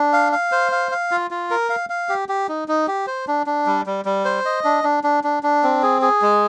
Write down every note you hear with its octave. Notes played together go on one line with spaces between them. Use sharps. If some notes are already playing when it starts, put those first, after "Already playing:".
Already playing: D4
F5
F5
C5
F5
F5
F4
F4
A#4
F5
F5
G4
G4
D#4
D#4
G4
C5
D4
D4
G3
G3
G3
C5
D#5
D4
D4
D4
D4
D4
C4
G#4
G#4
G#3